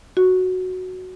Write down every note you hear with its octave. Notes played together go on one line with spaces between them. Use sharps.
F#4